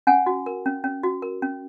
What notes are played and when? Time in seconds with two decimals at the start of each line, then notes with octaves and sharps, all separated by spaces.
0.07 C#4 F#5 G#5
0.26 F#4
0.46 A#4
0.66 C#4
0.84 C#4
1.03 F#4
1.22 A#4
1.42 C#4